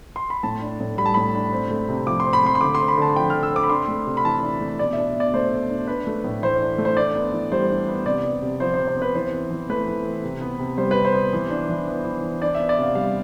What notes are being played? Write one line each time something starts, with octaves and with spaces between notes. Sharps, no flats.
C6
B5
A2 A5
D4
A2
G3 B5
A5
A2 B5
D4
C4
A3
C3
F3 D6
C6
C4
B5
A3 C6
C6
D3 D6
C6
C4
B5
D3 A5
F3 G5
D3 F6
E6
C4 D6
B5
D4 C6
A3
C3
B5
E3 A5
D4
A3
B2 D5
D4 E5
B2 D5
A3 C5
B2
D4
D4 B4
A3
A2
E3 C5
D4
A3
C5
D4 D5
B3
E3
G3 C5
D4
B3
C3 D5
B3
C3
F3 C5
C3 C5
C5
B3
B4
E3 C5
C4
E3
A3 B4
E3
C4
C3
B3
C3
G3 C5
B4
C3
C5
B3
E3
D4
E3
B3
E3
D4
D4 D5
B3 E5
D5
C3 F5
G3 F5